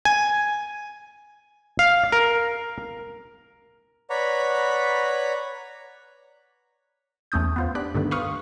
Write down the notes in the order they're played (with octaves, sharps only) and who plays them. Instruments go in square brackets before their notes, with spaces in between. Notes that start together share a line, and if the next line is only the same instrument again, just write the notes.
[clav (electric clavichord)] G#5
F5
A#4
[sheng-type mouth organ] B4 C#5 D5 F#5 A#5 B5
[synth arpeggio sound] E2 A3 C#4 D#6 G6
B3 F4 C5
D4 G4 B5 D6 F#6
G2 D3 D#3 A3 B3
B4 C5 F5 C#6 D#6 F6